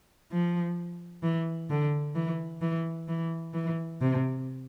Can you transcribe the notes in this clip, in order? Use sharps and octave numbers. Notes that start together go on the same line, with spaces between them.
F3
E3
D3
E3
E3
E3
E3
C3